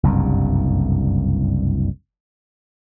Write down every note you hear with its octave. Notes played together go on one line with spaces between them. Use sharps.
F#1 C2 G2